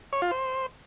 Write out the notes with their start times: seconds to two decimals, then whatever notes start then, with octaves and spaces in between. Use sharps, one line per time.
0.13 C#5
0.22 F4
0.31 C5